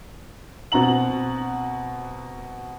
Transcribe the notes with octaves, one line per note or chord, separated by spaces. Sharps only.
B2 C4 F#4 A#5 F#7